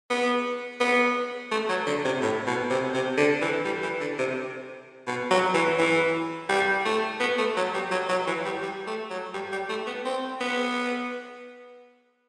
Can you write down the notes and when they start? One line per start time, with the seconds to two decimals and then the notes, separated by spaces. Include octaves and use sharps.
0.10 B3
0.80 B3
1.51 A3
1.69 F#3
1.87 D3
2.05 C3
2.22 A2
2.47 B2
2.70 C3
2.94 C3
3.17 D3
3.41 E3
3.65 G3
3.82 E3
4.00 D3
4.18 C3
5.07 B2
5.31 F#3
5.54 E3
5.79 E3
6.49 G3
6.85 A3
7.20 B3
7.38 A3
7.57 F#3
7.74 G3
7.91 F#3
8.09 F#3
8.27 E3
8.45 G3
8.62 G3
8.87 A3
9.10 F#3
9.34 G3
9.52 G3
9.69 A3
9.86 B3
10.05 C4
10.41 B3